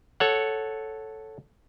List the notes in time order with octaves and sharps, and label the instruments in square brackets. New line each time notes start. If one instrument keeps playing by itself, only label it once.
[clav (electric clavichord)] A4 C#5 F#5